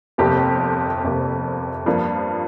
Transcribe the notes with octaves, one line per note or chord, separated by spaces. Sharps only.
G1 F2 C3 A#3 G4
G1 F2 C3 A#3 G4
G2 F3 A#3